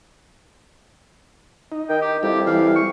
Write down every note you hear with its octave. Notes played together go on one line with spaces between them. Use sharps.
D#4
D#3 G5
G4
F2 G3 E4 G4
E3 F5
C#6